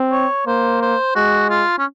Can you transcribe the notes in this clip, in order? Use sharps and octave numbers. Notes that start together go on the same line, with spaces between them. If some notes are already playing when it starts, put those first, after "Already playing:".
Already playing: C4
C#5
A#3 C5
C5
G#3 F#4
F4
C#4